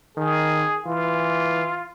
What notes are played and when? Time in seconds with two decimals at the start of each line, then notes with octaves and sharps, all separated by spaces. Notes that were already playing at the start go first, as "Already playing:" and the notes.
0.17 D#3 G#4
0.86 E3 F4